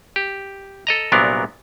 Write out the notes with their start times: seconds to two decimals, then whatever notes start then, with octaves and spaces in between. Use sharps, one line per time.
0.16 G4
0.87 A4 D#5 A#5
1.12 C2 A#2 F#3 B3 D4 A#4